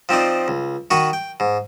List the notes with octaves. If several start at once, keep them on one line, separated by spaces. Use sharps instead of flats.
F3 C4 D#4 D5
C#2
D#3 F#4 B5 C#6 D#6
G5
G#2